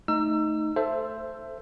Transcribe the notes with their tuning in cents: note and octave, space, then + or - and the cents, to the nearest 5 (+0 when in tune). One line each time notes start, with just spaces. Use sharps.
A3 +0 D#4 +0 E6 +30
A4 +0 C5 +0 E5 +20